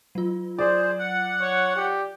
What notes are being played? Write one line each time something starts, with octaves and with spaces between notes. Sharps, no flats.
F#3 F4
G#4 C5 D5
F#5
C#5
G4